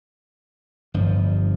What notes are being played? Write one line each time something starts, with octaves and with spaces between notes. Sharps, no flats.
G1 G2 F3